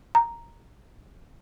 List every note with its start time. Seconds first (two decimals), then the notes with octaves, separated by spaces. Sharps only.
0.15 A#5